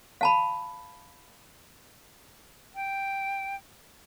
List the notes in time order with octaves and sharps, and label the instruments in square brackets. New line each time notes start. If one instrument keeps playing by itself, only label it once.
[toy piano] F5 A5 B5
[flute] G5